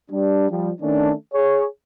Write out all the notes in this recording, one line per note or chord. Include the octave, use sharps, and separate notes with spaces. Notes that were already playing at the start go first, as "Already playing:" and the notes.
G3 D4
F3 G3
D#3 A3 C#4 D4
G#4 C#5